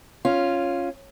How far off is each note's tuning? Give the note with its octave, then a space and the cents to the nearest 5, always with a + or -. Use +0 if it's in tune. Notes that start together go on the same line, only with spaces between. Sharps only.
C#4 +0 F4 +0